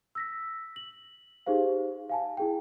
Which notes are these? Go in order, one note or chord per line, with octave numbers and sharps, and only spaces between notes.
E6 A#6 B6
F#7
D#4 G4 G#4 C5 F5
F5 G#5 A5
E4 G#4 G5